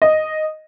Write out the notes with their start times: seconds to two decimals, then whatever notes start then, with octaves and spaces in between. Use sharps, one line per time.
0.02 D#5